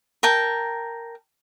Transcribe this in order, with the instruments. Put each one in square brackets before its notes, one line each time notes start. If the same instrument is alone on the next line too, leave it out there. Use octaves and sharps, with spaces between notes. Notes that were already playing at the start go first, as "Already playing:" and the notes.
[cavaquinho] A#4 G5 A5